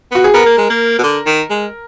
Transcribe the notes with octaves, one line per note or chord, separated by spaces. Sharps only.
B3 F#4
G#4
B3 A#4
A#3
G#3
A#3
B2
D3
D#3
G#3